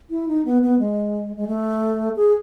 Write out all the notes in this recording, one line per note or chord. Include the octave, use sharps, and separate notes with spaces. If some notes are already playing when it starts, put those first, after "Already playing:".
E4
D#4
B3
B3
G#3
G#3
A3
G#4